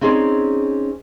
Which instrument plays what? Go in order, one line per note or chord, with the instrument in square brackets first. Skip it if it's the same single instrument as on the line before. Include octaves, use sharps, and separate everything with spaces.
[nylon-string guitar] C4 C#4 D#4 G#4 C5 D5